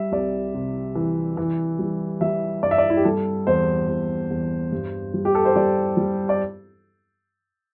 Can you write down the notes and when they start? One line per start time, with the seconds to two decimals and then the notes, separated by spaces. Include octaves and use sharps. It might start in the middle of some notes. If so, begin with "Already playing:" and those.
Already playing: G3 E5
0.12 C2 D5
0.55 C3
0.95 E3
1.37 E3
1.79 G3
2.21 G3 E5
2.63 G2 D5
2.71 E5
2.78 D5
2.90 E4
2.97 G4
3.05 G3 A4
3.47 E2 C5
3.88 E2
4.30 E2
4.72 G2
5.14 G3
5.25 G4
5.35 A4
5.45 C5
5.56 G3 D5
5.97 G3
6.29 D5